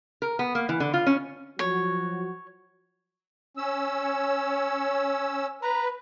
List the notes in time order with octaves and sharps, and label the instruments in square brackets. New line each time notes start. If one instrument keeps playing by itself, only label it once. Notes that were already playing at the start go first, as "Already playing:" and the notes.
[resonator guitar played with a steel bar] A#4
B3
A#3
E3
D3
F4
C#4
[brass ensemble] F3 F#3 F#4 [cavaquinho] C#5
[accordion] C#4 E6
[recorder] C#5
[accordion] B4 [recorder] A#5